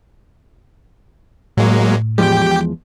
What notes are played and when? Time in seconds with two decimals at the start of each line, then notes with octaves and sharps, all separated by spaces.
1.57 A2 F#3 G#3 A#3
2.18 E2 F3 G#3 G4 G5